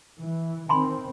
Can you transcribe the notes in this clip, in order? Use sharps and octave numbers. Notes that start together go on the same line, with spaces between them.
E3
D#3 C4 G#5 B5 C6